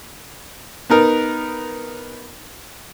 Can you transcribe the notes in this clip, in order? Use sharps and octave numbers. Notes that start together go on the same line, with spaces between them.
B3 D#4 A#4